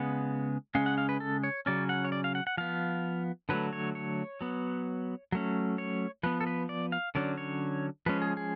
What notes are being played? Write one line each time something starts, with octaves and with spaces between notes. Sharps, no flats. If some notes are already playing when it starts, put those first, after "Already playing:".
Already playing: C#3 G#3 B3 F#5
C#3 G#3 C#4 F5
F#5
F5
B4
A4
C#5
C#3 F#3 C#4 D5
F#5
C#5
D5
F5
F#5
F#5
F3 B3 F5
D3 F#3 A3 B4
C#5
C#5
F#3 B3
F#3 A3 C#4
C#5
F3 B3 B4
A4
B4
D5
F5
D3 F#3 C#4 D5
C#5
F3 G#3 C#4 B4
G#4
G#4